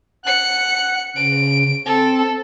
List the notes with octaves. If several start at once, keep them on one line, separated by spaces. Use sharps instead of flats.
F#5 F#6 C#7
C#3 D7
C4 A4